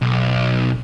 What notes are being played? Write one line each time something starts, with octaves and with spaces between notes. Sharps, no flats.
B1